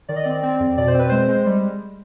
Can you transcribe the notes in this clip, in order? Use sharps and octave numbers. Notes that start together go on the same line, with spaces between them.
D#3 D5
D#5
C4 D5
C4
F2
B2 D5
C5
C4 B4
G#3 C5
G#3
G3